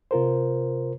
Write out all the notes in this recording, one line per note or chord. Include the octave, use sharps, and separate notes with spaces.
C3 F4 A#4 C5